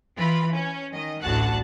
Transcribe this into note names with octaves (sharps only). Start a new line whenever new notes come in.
E3 F4 B5
C#4
D#3 D#5
A1 D2 F#4 F#5 A5 F#6